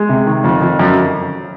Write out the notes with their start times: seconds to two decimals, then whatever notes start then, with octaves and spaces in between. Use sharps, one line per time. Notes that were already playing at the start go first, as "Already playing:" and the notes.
Already playing: G#3
0.09 C3
0.26 D#3
0.44 F2
0.62 F2
0.79 F#2